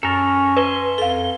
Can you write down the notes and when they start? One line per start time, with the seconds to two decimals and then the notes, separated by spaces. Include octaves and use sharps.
0.03 F#2 C#4 A4 A#4
0.57 B4 E5 G#5 C6
0.98 F2 A4 F5 G7